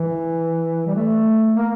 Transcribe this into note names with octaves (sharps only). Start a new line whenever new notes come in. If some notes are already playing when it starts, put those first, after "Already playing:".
Already playing: E3
G3
A3
A#3